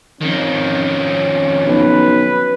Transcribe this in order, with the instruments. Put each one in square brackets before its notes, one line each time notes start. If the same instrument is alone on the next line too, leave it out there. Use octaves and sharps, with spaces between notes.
[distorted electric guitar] F2 D#3 [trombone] C#4
[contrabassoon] B1 [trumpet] B4